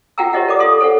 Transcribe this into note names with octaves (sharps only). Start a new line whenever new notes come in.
F4 F#4 F#5 G5 A#5 E6
G4 C5 C#5 D#5 E5 F#5
A#4 D5 D6 D#6
A4 F5 C6 D#6
A4 C5 C#5 F#5